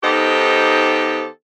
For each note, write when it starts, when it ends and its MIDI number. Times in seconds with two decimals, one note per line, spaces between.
0.03 1.25 51
0.03 1.25 59
0.03 1.25 63
0.03 1.25 67
0.03 1.25 69
0.03 1.25 72